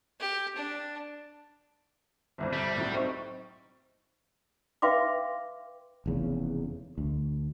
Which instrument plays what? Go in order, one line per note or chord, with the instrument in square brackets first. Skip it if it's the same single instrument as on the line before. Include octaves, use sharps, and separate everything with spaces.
[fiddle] G4
D4
[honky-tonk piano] G1 C2 F2
[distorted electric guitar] G3
[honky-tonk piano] C2 A2 F#3
C4 D#4 C#6
[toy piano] B4 E5 F5 G5 C6 D6
[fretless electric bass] F1 E2 C#3
D2